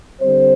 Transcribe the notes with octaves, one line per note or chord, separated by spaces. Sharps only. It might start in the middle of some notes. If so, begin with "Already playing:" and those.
D3 G3 C4 C5